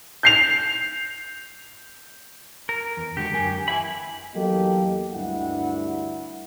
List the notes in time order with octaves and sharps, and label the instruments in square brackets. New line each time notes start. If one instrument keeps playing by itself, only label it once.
[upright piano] G6 C7 F7
[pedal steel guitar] A#4
[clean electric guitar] E2
[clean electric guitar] D3 G#3 F#4 [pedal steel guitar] G4
[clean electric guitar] F#2 A#4 G#5
[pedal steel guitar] E3 E4 B5 [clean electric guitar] E5 F5 G#5
[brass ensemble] E2 F#3 A#3 G4 A4 D#5
D2 G2 D4 E4 F#5